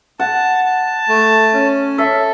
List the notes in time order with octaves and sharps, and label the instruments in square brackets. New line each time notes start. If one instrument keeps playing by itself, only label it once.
[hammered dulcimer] F#5 [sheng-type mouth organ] A5
[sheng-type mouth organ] A5
A3
C#4
[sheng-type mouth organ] A4 [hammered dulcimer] E5